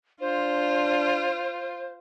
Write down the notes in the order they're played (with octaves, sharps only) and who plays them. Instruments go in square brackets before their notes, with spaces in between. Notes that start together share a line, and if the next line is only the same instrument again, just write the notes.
[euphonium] D4 [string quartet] F4 [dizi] C5